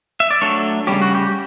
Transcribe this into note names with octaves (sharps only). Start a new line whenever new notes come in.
E5
D5
F#3 A3 D4 A4 C#5
C#3 G3 C#4 G4
F#4
G4